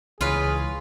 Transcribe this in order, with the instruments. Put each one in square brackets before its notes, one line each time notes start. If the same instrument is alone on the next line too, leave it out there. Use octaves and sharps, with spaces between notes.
[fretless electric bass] C#2 [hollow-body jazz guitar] E3 C#5 [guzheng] F4 B4 [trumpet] G#4